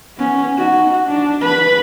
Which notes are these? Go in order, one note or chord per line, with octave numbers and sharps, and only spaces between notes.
B3 C#4
D#4 F#4
D4
B4 B5